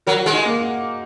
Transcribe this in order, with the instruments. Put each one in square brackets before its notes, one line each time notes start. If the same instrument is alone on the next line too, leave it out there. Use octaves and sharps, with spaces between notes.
[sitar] F#3 [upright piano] A#4
[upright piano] F#4
[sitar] G#3
[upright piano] D#4
A#3